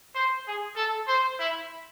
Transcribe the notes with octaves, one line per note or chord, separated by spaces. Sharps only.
C5
G#4
A4
C5
E4